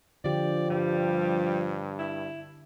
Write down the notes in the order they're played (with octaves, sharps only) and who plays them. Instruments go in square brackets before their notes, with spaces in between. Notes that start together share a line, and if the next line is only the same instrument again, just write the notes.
[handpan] D3 G4 [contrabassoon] F3 [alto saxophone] D5
[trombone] G2 [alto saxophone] G3
[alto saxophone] E4